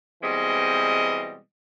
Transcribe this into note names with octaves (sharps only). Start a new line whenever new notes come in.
B2 E3 G3 G#3 C4 D#5